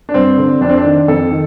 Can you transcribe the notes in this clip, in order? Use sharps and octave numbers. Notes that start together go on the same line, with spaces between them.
D4
G2 C4
D3
F2 D4
C4
D4
D#3
F2 A4
D#3